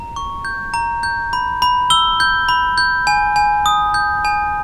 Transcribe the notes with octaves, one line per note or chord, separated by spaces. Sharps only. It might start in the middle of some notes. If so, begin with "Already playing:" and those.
Already playing: A#5
C#6
G6
A#5
G6
B5
B5
E6 G7
G6
B5
G6
G#5
G#5
D#6
G6
G#5